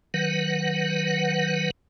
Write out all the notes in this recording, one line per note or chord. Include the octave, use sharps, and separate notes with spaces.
D#3 F#3 B4 F#5